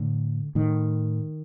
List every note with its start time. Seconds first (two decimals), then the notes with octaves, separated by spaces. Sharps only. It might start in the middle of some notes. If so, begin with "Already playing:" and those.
Already playing: A2 D3
0.55 A2 D#3